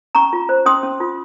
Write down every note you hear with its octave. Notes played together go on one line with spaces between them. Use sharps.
C#4 A#5 C#6
F4
C5
C#4 C6 D#6
C#4
F4